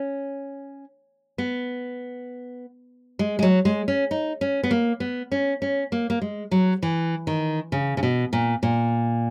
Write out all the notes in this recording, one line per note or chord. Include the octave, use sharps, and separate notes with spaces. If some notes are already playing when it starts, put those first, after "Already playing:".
Already playing: C#4
B3
G#3
G#3
F#3
G#3
C#4
D#4
C#4
B3
A#3
B3
C#4
C#4
A#3
A#3
G#3
F#3
E3
D#3
C#3
C#3
B2
A#2
A#2